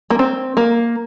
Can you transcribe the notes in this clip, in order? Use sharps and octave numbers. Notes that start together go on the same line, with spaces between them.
A#3
C4
A#3